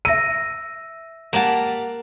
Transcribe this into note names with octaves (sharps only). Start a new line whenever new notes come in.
E5 E6 A#6 D#7
A#3 G4 D5 F#5 A5